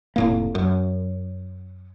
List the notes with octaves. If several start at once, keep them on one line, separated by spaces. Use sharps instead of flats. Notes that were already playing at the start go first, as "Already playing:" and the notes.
F1 A2 A#3
F#2